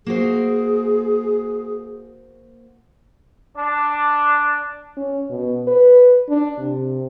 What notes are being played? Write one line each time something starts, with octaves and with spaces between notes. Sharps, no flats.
A#3 F#4 G#4 C5
D4
C#4
B2
B4
D4
C3